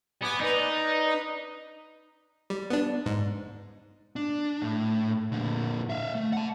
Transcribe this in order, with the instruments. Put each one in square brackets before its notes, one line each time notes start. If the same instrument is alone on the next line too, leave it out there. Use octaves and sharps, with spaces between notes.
[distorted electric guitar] B3 [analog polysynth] G#5 D6
[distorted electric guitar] D#4 [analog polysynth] B4 D5
[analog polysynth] B4
[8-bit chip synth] G3
B3 D4
G#2
[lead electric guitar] D4
A2
A#2 D3
E5 F5
A3
F#5 A5